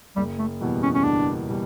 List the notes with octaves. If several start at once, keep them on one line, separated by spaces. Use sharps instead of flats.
F#1 G3
A3
E2 B2 G3
C#4
C#4
F#1 D4
B2 G3